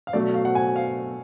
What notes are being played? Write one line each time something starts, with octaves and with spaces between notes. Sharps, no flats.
F5
B2 F#3 A3 D5
F5
F#5
G#5
F5